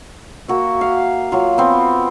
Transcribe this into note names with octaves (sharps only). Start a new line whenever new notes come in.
A#3 F#4 E5
F5
F#3 F4
B3 C4